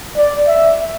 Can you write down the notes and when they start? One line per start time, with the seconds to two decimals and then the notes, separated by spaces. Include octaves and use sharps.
0.17 D5
0.48 E5